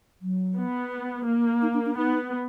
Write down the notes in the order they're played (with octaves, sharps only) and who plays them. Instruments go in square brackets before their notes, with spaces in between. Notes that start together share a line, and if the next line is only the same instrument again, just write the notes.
[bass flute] F#3
[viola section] B3
A#3
[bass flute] D#4
D4
D4
[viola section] B3 [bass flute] D#4